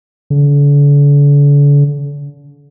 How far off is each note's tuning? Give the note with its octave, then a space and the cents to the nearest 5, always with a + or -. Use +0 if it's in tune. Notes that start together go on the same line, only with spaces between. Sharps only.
D3 -40